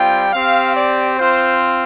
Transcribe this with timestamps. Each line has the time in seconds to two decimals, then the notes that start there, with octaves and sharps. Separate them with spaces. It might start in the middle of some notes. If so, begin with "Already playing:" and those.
Already playing: G3 C4 F4 G5
0.33 C4 G4 F5
0.76 D5
1.19 C4 F4 C5